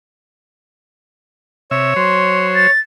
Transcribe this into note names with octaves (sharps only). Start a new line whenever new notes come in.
C3 C#5 E5
F#3 C5 C6
A6